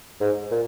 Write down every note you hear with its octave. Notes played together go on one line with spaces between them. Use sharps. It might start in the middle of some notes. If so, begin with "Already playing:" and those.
G#2
A#2